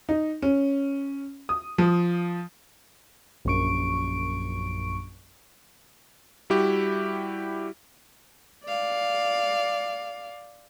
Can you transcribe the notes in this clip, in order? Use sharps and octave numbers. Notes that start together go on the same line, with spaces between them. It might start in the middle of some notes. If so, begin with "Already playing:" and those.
D#4
C#4
D#6
F3
A#1 F#2 C#6 D7
G3 E4 F#4 G4
D5 F5